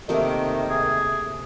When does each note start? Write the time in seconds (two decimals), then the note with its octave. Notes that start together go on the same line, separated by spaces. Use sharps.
0.09 C3 D#3 A3 A#3
0.70 G#4